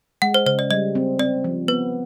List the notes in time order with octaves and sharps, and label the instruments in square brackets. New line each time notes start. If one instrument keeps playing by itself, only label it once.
[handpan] G#3 [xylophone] F#5
[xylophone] C5
[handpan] C#3 [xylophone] C5
[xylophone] D5
[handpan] G3 [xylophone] D#5
[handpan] C4
[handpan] C4 [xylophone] D5
[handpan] F3
[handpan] B3 [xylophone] B4